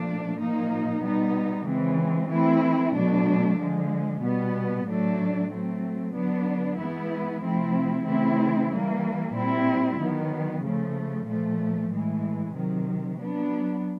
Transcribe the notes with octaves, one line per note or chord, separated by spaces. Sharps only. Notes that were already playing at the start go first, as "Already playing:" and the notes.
Already playing: A#2 F3 A3 D4
A#2 F3 A#3 D#4
B2 G3 B3 D#4
C#3 E3 G#3 C4
E3 A3 C4 E4
B2 F#3 A3 D4
D3 F3 G#3
B2 G3 B3
A2 F#3 A3 D4
F#3 A3 C4
D3 F#3 B3 D4
E3 G#3 B3 E4
C3 F3 A3 C4 E4
C#3 E3 A3 C4 E4
E3 G3 A#3
A#2 G3 C4 E4
D#3 F#3 B3
C#3 F3 A3
A#2 F3 A3
A2 E3 G#3
C3 D#3 F#3
F#3 B3 D4